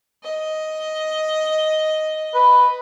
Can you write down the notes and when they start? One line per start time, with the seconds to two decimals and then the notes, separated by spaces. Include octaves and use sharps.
0.23 D#5
2.35 B4